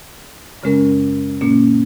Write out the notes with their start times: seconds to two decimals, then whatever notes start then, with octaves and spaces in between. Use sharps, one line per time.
0.63 F#2 C#3 G#3 C#4 A#4
1.41 A#2 A#3 C#4